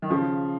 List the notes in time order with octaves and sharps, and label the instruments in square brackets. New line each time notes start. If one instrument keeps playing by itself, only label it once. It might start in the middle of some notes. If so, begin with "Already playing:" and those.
[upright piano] D#3
C#3 F3